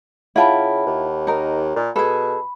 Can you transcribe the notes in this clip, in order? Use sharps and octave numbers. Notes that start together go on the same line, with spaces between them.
C#3 E4 F4 F#5 G5 A5 B5
D#2
D#4 A#4
A#2
B2 G#4 A4 B5